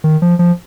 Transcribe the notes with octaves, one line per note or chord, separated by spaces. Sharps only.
D#3
F3
F3